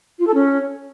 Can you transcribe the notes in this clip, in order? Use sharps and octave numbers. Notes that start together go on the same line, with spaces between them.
F4
A4
C#4